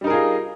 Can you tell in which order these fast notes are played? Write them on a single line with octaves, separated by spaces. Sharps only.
G3 D#4 A#4 G#4 F4